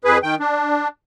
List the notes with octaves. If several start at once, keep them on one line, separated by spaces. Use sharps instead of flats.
F2 G#4 B4
D#3 G5
D4